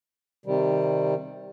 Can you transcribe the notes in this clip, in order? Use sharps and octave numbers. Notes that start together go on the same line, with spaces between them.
C3 D#3 G3